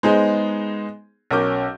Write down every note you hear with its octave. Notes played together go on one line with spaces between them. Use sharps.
G#3 B3 D#4 G#4 C5
B1 C#4 A#4 D6 G6